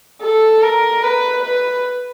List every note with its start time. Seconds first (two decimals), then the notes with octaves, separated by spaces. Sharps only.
0.22 A4
0.62 A#4
1.03 B4
1.43 B4